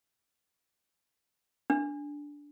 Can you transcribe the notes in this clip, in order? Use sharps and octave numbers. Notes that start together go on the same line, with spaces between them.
D4